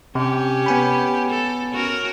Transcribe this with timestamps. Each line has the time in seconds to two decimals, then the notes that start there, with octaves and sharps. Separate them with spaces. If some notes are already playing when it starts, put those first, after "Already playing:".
0.15 C3 C#4 G4
0.66 B3 G#5 B5
1.30 A4
1.71 C#4 F#4 A#4